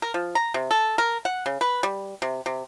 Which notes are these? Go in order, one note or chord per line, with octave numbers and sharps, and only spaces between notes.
A#4
F3
A#5
C3
A4
A#4
F#5
C#3
B4
G3
C3
C3